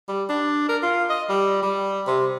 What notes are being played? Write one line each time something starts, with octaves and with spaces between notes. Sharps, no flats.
G3
D4
A#4
F4
D#5
G3
G3
C3